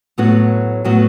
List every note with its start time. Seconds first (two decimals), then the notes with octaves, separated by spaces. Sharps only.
0.18 A2 F#3 B3 F#4
0.85 A2 F#3 B3 F#4